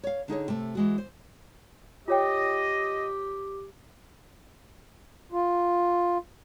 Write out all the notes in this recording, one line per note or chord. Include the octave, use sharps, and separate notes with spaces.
C#5 F5
D3 D#4 G#4 C#5
C3 A3
E3 G#3 F#4
C5
F4 G4 C#5 D#5 G5
F4